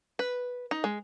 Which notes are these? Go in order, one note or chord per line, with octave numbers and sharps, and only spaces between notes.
B4
D#4
G#3